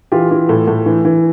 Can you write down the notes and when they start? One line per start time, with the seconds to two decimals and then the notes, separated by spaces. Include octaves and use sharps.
0.12 E3 F4 G4
0.31 E3
0.49 A2
0.68 A2
0.86 E3
1.05 E3